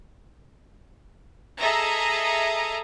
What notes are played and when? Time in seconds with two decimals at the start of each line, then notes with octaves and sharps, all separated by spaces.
1.59 G#4 A4 D#5 E5 A#5 D#6